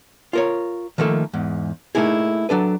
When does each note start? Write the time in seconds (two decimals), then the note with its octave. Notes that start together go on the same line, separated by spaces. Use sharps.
0.33 F4 A#4 C#5
0.98 D#3 F3 A3 A#3 A4
1.33 E2 G#2
1.95 A3 A#3 D#4 E4 G#4
2.49 F#3 D4 A4 B4